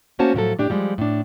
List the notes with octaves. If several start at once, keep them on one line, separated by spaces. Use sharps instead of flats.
A3 A#3 C#4 F#4 C5 A5
A2 F3 F#3 A4
A2 D4 G4
F3 G3 G#3
A2 D4